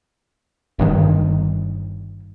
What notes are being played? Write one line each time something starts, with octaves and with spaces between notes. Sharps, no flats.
G1 G2 D#3